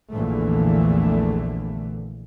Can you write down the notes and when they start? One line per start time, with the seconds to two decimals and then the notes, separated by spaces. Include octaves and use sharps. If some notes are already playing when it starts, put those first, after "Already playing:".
0.12 A#1 E2 A#2 D3 E3 A3